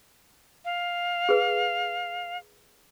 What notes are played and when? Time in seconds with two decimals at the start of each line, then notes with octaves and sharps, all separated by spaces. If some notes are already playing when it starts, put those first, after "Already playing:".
0.65 F5
1.29 G#4 B4